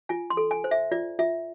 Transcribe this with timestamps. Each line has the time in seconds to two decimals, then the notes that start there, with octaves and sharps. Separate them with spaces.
0.09 F4 G#5
0.30 C6
0.37 A4
0.51 G#5
0.64 C5
0.71 E5
0.92 F4 D5
1.19 F4 E5